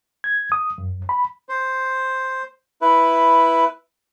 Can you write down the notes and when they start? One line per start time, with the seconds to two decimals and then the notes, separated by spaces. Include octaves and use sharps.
0.24 G#6
0.52 D#6
0.78 F#2
1.09 B5
1.49 C5
2.82 E4 B4